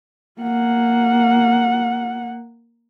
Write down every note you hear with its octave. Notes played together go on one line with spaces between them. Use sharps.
A#3 F#5